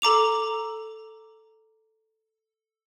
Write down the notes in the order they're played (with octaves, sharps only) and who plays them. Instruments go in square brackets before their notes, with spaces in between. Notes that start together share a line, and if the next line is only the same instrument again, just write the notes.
[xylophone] A4 A#5 D6 F7